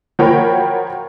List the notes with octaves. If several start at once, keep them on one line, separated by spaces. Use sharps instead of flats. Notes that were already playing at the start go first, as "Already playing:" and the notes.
F3 F#4 A#4 C#5 G5 B5